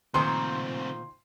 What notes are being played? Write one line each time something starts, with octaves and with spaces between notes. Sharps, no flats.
A#2 D#3 A3 C4 C5 C6